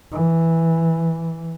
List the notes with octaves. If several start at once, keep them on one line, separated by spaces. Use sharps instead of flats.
E3